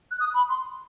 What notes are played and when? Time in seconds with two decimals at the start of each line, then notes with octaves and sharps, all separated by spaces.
0.11 F#6
0.20 D#6
0.34 B5
0.49 C6